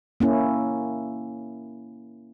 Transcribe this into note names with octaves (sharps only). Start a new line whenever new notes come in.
A#3 C#4 E4